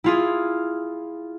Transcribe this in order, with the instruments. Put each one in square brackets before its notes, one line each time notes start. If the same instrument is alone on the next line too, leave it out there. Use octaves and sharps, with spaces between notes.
[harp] E4 F4 G#4